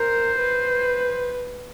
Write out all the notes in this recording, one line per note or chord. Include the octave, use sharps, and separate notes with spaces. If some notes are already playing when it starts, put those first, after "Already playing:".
Already playing: A#4 C5
B4